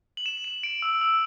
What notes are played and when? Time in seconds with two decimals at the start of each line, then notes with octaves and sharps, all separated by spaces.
0.17 F#7
0.26 E7
0.44 E7
0.63 D7
0.82 E6
1.01 E6